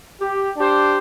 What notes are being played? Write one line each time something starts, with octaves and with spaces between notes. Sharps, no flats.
G4
D4 G4 C5